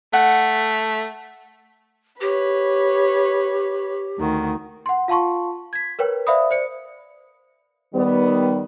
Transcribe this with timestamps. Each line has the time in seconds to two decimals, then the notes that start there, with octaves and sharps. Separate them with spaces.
0.13 A3 F#5
2.21 G4 B4 C#5
4.17 D2 D#3 F#4
4.86 F#5 C6
5.08 F4 F5 A5 C6 C#6
5.73 G#6 B6
5.99 A#4 B4 C#5 G5
6.27 C5 D5 E5 F5 B5 D#6
6.51 C5 D5 C#7
7.94 D#3 G3 B3